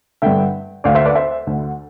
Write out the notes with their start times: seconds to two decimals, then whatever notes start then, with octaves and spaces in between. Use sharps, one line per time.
0.22 G2 D3 E5 G5
0.84 D2 D3 D5 F5
0.95 C5 E5
1.05 B4 D5
1.15 C5 E5
1.47 D2 D3